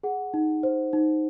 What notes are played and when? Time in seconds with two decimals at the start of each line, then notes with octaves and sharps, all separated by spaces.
0.03 G#4 F#5
0.34 D#4
0.63 C5
0.93 D#4